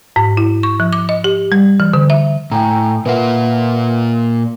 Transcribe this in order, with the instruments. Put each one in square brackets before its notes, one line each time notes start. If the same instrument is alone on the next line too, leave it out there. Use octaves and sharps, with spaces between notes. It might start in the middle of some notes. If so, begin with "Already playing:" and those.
[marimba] G#2
E4
C#6
F3
D6
D#5
G4
G3
E3
D3
E5
[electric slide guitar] A2 [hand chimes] G5 G#5 A#5
[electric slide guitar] A#2 A#3 F4 [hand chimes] B4 E5 F#5